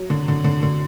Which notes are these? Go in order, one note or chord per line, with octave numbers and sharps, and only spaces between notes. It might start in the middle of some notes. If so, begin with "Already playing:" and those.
Already playing: F#3
D3
D3
D3
D3